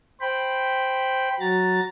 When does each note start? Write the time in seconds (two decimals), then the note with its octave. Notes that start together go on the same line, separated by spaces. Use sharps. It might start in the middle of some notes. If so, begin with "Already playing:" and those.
0.20 C5 G5 B5
1.40 F#3 F#4 A#5 A6